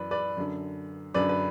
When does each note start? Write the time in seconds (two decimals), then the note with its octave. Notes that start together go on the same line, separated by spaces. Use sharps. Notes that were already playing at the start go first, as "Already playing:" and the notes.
Already playing: F#2 E3 B4 D5
0.11 B4 D5
0.37 F#2 D3
1.14 F#2 B4 D5
1.18 D3
1.29 B4